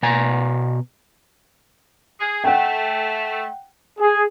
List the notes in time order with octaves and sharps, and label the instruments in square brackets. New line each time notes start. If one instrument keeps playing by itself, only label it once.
[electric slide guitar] B2 G#5 A#5
[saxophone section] G#4
[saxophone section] A3 [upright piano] F#5 G5
[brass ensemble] G#4